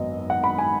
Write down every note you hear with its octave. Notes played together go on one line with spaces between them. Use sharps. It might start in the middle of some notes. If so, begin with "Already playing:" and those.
Already playing: G#1 F#2 F#3 B3 D#5
F#5
B5
G#5